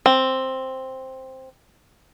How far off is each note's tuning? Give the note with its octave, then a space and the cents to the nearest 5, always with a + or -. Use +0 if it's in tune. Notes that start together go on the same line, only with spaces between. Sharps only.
C4 +5